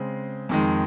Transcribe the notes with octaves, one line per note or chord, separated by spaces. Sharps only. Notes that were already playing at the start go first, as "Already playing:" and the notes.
Already playing: C#3 G#3 C4
F2 D#3 G#3